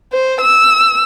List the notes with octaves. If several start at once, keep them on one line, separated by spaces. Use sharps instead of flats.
C5
E6